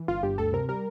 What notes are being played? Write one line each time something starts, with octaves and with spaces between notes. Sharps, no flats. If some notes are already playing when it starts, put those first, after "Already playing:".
Already playing: E3
G1 F4
G2 G4
D2 A4
C3 A#4
G3 A#4